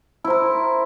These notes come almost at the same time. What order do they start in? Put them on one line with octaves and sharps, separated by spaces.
E4 C5 A#4